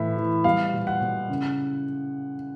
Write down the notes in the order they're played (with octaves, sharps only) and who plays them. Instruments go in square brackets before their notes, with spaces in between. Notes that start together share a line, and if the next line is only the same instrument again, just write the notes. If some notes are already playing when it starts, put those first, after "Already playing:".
Already playing: [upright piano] A2 E3 E5
E3
G3 F5
A#2
F#5
A#2
C#3